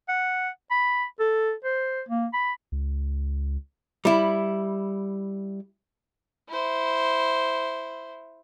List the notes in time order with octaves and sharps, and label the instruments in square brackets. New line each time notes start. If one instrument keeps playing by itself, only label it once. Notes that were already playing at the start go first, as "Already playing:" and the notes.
[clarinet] F#5
B5
A4
C5
A#3
B5
[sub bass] C#2
[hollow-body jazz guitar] G3 E4
[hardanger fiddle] E4 C5